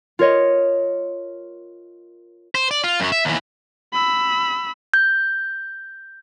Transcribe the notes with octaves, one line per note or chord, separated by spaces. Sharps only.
F4 A#4 C#5 D#5
C5
D5
F4
F#2 F#3
E5
D#2 E3
B5 E6
G6